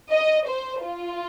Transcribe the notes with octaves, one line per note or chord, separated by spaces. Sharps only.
D#5
C5
F4